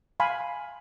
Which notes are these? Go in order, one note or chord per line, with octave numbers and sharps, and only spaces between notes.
F5 G#5 B5 C6